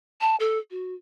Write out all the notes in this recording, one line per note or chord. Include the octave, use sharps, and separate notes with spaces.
A5
A4
F#4